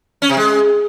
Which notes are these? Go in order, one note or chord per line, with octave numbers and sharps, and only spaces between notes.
C#4
C3
G#3